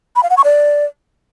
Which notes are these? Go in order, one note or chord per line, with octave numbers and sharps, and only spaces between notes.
B5
F5
F#5
C#6
D5